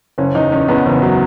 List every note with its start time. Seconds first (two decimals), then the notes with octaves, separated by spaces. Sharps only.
0.18 F#1 C#4
0.35 E2 D#4
0.52 E2 C#4
0.68 E2 B3
0.86 F#1 E3
1.03 F#3